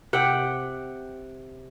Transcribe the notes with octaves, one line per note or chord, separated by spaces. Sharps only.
C3 F#5 G5